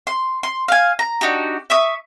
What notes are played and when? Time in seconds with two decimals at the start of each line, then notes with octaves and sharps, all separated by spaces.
0.07 C6
0.43 C6
0.68 F5 G#5
0.99 A#5
1.21 D4 D#4 F#4 G4
1.70 E5 C#6 D#6